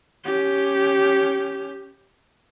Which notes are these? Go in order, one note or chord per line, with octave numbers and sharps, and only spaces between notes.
C#4 G4